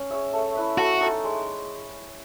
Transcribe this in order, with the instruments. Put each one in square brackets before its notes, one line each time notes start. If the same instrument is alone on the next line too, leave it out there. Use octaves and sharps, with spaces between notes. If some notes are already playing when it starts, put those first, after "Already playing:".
Already playing: [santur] C#4
G#4 C#5 E5
A3
E4 B4 E5
[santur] A3 [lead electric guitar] F#4
[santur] D#4 A4
G#3